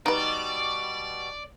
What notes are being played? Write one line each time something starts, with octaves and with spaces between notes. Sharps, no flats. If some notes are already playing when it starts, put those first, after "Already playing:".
B2 G3 D#4 B4 D5